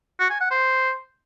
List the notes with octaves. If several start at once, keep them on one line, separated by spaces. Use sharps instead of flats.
F#4
G#5
F#5
C5